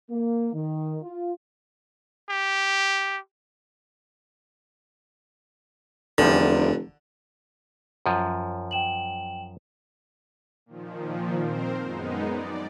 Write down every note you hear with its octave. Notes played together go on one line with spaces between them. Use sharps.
A#3
D#3
F4
G4
F1 E2 D3 F3 G3
F#2 F3
G5 E7 F#7
A#2 D#3 F3
C4 A#4 C5
F#2 G#3 B3 D#4
D5